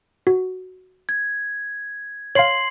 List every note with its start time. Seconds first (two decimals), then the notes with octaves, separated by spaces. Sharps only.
0.27 F#4
1.09 G#6
2.35 C#5 F5 C6 C7 F#7